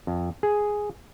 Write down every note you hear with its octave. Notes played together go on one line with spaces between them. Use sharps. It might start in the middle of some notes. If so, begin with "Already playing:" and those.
F2
G#4